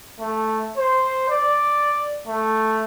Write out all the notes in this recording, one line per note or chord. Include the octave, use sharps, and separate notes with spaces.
A3
C5
D5
A3